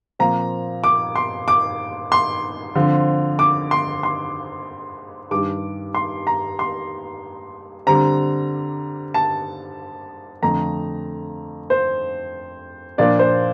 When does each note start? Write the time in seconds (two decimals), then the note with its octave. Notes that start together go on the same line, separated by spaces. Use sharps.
0.19 A#2 F3 C4 A#5
0.84 D6
1.16 C6
1.48 D6
2.12 C6
2.75 D3 F3 C4
3.39 D6
3.71 C6
4.03 C6
5.31 G2 D#3 G3 D6
5.95 C6
6.27 A#5
6.59 C6
7.87 D3 G3 C4 A#5
9.14 A5
10.42 F2 D3 A3 A#5
11.70 C5
12.98 A#2 F3 A#3 D4 D5
13.19 C5